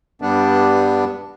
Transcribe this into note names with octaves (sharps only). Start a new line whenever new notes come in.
G2 G3 B3 D4